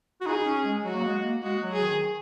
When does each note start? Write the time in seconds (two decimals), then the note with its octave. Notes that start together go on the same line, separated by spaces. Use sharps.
0.21 F#4
0.26 D#4 G#4
0.45 C#4
0.65 G#3
0.84 F#3 F#4
0.95 A#3
1.04 G#3
1.23 A#3
1.42 G#3 F#4
1.62 F#3
1.73 G#4
1.82 D#3